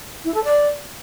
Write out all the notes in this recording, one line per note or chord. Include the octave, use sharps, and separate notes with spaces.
E4
A4
D5